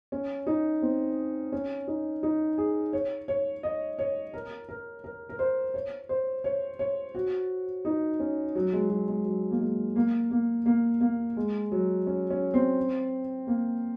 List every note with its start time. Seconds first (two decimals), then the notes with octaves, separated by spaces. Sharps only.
0.12 C#4
0.47 D#4
0.82 C4
1.52 C#4
1.87 D#4
2.23 D#4
2.58 G#4
2.93 C#5
3.28 C#5
3.63 D#5
3.99 C#5
4.34 A#4
4.69 A#4
5.04 A#4
5.29 A#4
5.39 C5
5.74 C#5
6.09 C5
6.44 C#5
6.79 C#5
7.15 F#4
7.85 D#4
8.20 C#4
8.55 F#3
8.73 G#3
8.90 F#3
9.08 G#3
9.25 F#3
9.51 A#3
9.60 G#3
9.96 A#3
10.31 A#3
10.66 A#3
11.01 A#3
11.37 G#3
11.72 F#3
12.07 C#4
12.30 C#4
12.54 C4
13.47 A#3